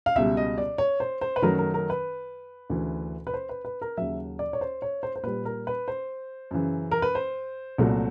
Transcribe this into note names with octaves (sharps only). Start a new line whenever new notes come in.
F5
C#2 B2 G3 E5
D#5
D5
C#5
C5
C5
B4
F#2 D#3 F#3 A3 A#4
A#4
A#4
B4
D2 C#3 E3
B4
C5
B4
B4
A#4
D#2 C#3 F#3 E5
D5
C#5
C5
C#5
C5
C5
A#2 G3 B4
A#4
B4
C5
F#2 C#3 E3
A#4
B4
C5
C2 A#2 F#3 A3